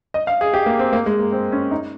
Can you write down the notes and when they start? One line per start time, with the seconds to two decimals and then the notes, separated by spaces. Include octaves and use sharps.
0.14 D#5
0.27 F5
0.41 G#4
0.54 G4
0.66 A#3
0.79 C4
0.93 A#3
1.06 G#3
1.19 A#3
1.32 C4
1.52 C#4
1.71 D#4